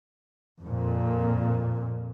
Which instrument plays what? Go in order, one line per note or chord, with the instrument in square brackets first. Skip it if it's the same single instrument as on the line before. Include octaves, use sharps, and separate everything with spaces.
[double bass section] F2 A#2